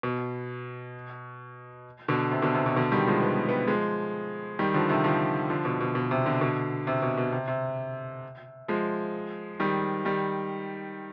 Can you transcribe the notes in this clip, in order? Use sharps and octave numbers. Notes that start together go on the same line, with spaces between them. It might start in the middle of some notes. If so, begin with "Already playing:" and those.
B2
B2 D3
C3
B2 D3
C3
B2
B2 D3
D#3 G3
F3 G#3
B3
G#3
G3 B3
F3 G#3
D#3 G3
D3 F3
C3 D#3
D3 F3
D3 F3
B2
B2
B2
C3
B2 D3
B2 D3
C3
B2
B2
C3
C3
F3 G#3
D#3 G3
D#3 G3